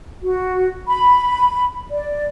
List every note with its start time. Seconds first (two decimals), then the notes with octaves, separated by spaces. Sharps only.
0.24 F#4
0.87 B5
1.91 D5